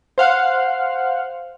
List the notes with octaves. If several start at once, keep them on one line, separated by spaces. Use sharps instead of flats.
C5 F5 F#5